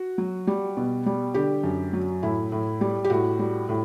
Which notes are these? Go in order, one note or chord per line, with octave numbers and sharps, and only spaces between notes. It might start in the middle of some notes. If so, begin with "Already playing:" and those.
Already playing: F#4
F#3
G3
B2
G3
D3 G4
F#2
F#3
A2 E4
A2
G3
G4
A2 F#4
G3
A2